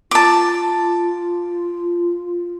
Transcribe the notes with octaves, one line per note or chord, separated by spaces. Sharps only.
F4 A5 D6